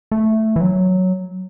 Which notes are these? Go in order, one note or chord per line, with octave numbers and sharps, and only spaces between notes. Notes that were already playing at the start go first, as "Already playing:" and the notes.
A3
E3
F#3